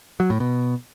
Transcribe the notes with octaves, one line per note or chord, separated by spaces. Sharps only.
F#3
A2
B2